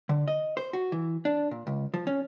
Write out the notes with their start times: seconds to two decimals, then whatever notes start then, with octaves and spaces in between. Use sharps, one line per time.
0.09 D3
0.28 D#5
0.57 C5
0.73 F#4
0.92 E3
1.25 D4
1.51 A#2
1.67 C#2
1.94 F3
2.07 C#4